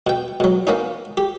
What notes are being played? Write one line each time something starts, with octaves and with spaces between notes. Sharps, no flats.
B2 G5
B2 F#3
A#3 B3 C#4 D#4
G4